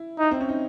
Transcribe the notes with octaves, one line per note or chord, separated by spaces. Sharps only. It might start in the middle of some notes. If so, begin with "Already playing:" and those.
Already playing: E4
D#4
C4
C#4
D#4